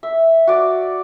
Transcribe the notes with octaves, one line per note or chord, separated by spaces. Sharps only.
E5
F#4 D5